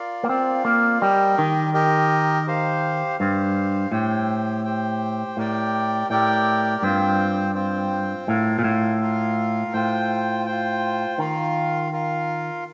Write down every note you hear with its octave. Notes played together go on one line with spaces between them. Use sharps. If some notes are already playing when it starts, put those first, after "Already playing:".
Already playing: F4 A#4 D5 F5
A#3
C4 F4 A#4 D5 F5
A#3
G3 G4 A#4 D#5
D#3
G4 A#4 D#5
G4 C5 F5
G2 G4 C5 F5
A2 G4 C5 G5
G4 C5 G5
A2 G4 A#4 D5 G5
A2 G4 A#4 D5 G5
G2 C4 F4 C5 G5
C4 F4 C5 G5
A2 F4 A#4 F5
A#2
A2
F4 A#4 F5
A2 F4 C5 G5
F4 C5 G5
D#3 F4 A#4 F5
F4 A#4 F5